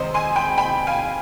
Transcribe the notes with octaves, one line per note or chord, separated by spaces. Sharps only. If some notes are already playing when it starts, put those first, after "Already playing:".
Already playing: C3 D#3 G#3 C5 D#5
G#5 C6
G5 B5
G5 B5
F5 G#5